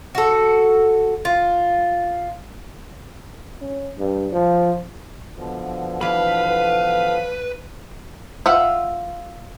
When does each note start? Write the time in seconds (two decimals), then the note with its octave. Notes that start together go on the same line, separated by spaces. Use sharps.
0.15 F#4 A4
1.25 F4
3.62 C#4
3.99 G2
4.32 F3
5.37 B2 D3 F3
6.01 E3 B4 F5 B5
8.46 F4 E5 F#5